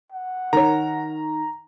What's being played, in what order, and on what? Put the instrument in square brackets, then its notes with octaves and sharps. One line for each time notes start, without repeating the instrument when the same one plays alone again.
[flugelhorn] F#5
[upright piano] D#3 [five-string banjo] A#4 C#5 [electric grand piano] A#5